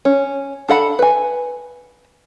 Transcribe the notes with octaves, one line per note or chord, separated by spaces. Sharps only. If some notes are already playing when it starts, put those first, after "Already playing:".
C#4
D4 A4 F#5 B5
B4 G#5